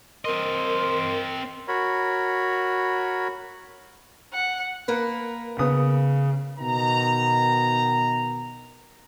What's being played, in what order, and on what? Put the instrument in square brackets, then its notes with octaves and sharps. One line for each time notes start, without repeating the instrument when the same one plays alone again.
[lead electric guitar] C4 D#5 [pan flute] A#4 [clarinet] C6
[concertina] F#4 A#4 C#5 B5
[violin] F#5
[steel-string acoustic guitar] A#3 A#4 B4
[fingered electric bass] C#3 [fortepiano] B3 D#6
[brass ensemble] B2 D#3 B3 A#5